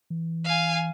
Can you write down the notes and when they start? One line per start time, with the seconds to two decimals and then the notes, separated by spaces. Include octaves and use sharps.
0.10 E3
0.45 F5 G#5